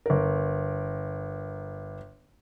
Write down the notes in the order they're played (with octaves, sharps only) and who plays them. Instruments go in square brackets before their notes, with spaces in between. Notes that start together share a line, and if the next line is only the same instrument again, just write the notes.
[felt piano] G1 A#4